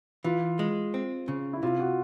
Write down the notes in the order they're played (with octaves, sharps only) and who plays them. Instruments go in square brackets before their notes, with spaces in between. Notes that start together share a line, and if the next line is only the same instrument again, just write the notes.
[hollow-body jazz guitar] E3 [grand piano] F4
[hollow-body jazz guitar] G#3
C4
C#3
[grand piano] E4
[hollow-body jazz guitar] C3 [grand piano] F4
[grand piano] F#4